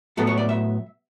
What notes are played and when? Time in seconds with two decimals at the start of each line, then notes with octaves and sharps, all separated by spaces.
0.17 A2 F#3 B3 A4
0.27 C#5
0.37 D5
0.49 E5